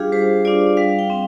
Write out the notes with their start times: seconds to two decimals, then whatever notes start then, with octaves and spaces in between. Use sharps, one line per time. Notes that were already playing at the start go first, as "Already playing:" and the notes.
Already playing: G3 D4 F4 G4 G#4 F5
0.12 G3 C5
0.45 D4 F4 D5
0.77 G3 F5
0.99 G5
1.10 C4